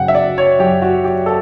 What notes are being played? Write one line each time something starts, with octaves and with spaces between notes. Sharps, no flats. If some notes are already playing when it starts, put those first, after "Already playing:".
Already playing: F#2 C#3 F#5 G5
E5
D5
F#3
C#5
F#2 G4
F#4
F#3
G4
A4